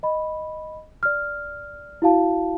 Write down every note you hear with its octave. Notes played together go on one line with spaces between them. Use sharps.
D#5 B5
D5 F6
E4 F#4 F5 A5